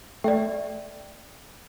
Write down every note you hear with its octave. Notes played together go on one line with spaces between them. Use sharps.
A3 D5 E5 G5